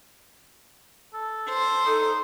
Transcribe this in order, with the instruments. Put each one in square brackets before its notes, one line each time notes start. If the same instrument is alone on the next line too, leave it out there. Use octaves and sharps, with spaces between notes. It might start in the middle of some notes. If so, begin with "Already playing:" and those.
[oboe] A4
[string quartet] C5
[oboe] D#4 [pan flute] A4